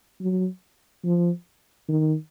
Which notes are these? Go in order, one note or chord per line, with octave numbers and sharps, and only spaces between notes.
F#3
F3
D#3